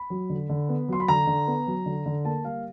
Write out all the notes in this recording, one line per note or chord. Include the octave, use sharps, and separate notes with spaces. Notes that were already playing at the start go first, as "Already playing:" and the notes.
Already playing: B5
F#3
D3
D3
B3
F#3 C6
B5
D3 A#5
D3
B3
F#3
D3
D3
A#3 A5
G3 F5